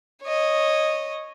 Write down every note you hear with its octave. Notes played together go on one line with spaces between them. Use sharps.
C#5 D#5